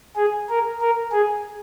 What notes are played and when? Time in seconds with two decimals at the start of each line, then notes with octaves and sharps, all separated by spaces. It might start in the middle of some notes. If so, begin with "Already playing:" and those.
0.16 G#4
0.49 A#4
0.81 A#4
1.12 G#4